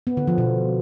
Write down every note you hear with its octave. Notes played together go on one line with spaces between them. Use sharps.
B3
D3
F3
B2